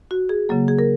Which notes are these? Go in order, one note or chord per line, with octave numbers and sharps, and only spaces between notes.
F#4
G#4
C#3 F#3 A#3
G#4
A#4